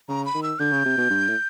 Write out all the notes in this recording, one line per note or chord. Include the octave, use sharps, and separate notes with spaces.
C#3 A#5
B5
D#3
E6
D3 G6
C#3
C3
B2
G2
A2